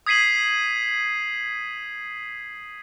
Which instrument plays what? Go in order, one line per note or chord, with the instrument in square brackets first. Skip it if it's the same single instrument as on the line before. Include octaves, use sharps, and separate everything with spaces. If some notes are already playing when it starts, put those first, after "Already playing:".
[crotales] D#6 G#6 B6 C7 D#7 F#7